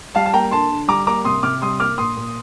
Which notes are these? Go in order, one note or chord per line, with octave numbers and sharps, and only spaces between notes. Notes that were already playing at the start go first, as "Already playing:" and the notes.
G3 F5 A5
A5
A#3 G5 A#5
D3 A5 C6
D3
G3 A#5 D6
A#3 A#5 D6
C3 C6 D#6
C3 D6 F6
G3 C6 D#6
A#3 D6 F6
A#2 C6 D#6
A#2